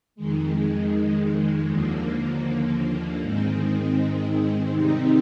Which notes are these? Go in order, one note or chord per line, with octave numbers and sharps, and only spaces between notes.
F2 D#3 G#3
D#2 D3 F3 A#3
G#2 D#3 G#3 C4
C3 D#3 G3 C4 D#4